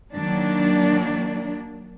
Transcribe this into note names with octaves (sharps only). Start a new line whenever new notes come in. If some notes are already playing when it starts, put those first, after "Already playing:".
D#3 F#3 A#3 D4